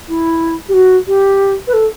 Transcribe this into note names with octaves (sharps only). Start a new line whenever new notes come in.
E4
G4
F#4
G4
B4
A4